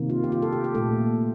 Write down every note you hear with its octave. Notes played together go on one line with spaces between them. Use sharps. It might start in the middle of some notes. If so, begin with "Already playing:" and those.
Already playing: C3 D#3 A#3
F4
G4
F4
A4
G4
G4
A#2 A3 A4